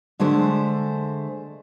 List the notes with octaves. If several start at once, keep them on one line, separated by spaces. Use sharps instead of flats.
D3 G#3 A3 C5